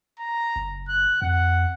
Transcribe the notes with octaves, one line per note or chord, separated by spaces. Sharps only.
A#5
F#1
F#6
F2 F#5